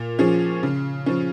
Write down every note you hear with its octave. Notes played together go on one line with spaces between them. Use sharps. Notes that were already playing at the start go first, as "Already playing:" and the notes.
Already playing: A#2
F3 C#4 G#4
C#3
F3 C#4